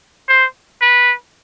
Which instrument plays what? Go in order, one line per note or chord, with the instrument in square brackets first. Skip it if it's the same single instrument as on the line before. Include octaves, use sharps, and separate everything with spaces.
[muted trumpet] C5
B4